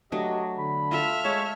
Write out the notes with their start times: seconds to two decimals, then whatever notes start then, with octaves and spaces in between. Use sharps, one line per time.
0.12 F#3 A3 D4 G4 D#5
0.58 D3 B5
0.91 F4 A4 E5 F6
1.25 G#3 C#5 A5